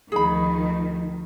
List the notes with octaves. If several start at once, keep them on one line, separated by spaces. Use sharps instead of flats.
D2 D#3 F3 G#4 B5